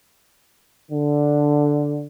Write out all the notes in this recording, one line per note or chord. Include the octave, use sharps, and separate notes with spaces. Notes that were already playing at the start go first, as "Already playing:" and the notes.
D3